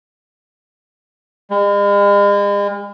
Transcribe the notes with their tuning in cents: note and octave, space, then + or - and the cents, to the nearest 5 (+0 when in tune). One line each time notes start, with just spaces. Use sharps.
G#3 -45